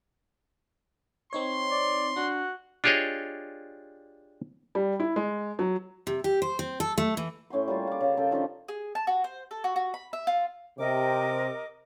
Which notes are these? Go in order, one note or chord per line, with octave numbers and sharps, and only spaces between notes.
C4 D#4 C#5 C6
D5
D4 F#4
D4 F4 G4 G#4 C#5 D#5
G3
E4
G#3
F#3
C3
G4
C5
C4
A4
A3
E3
A2 C#4 G5 C6
G3 A#3 F4
F4 D6
C#3 A#3
C#3 A4 G5
D#3 F3 C#4 D4
G#4
A5
F#4
C5
A4
F#4
F#4
B5
E5
F4
C3 A#4 D#5 D6